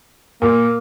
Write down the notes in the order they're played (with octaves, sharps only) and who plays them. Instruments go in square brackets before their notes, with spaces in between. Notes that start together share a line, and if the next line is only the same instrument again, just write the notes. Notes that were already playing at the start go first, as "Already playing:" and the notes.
[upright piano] A#2 [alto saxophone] A#3